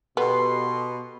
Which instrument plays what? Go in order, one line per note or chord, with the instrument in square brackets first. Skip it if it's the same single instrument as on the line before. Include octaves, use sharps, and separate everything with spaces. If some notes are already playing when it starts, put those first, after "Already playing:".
[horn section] B2 [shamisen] B3 [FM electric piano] G4 A4 B4 [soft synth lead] C6